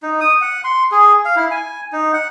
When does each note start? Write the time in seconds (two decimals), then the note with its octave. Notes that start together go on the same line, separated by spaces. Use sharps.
0.03 D#4
0.21 D#6
0.41 F#5
0.64 C6
0.91 G#4
1.25 F5
1.36 E4
1.51 G#5
1.93 D#4
2.13 F#5